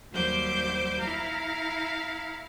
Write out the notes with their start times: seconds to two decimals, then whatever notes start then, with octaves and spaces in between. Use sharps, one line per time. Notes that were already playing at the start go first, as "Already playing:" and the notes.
0.12 D#2 F#3 G3 C5 D6 G6
1.00 E4 F5 A#5